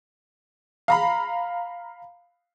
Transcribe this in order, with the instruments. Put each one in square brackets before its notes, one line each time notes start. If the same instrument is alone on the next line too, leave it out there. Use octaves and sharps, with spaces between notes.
[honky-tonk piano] F5 A#5 B5